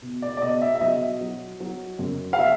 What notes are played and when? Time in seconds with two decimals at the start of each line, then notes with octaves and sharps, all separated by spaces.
0.02 B2
0.22 D5
0.37 D5
0.42 B2 D#5
0.62 E5
0.75 E5
0.81 F#3 D#5
1.21 F#3
1.60 F#3
1.99 F#2
2.33 F5
2.39 E5